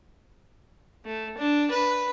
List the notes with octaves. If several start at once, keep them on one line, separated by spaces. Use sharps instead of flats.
A3
D4
B4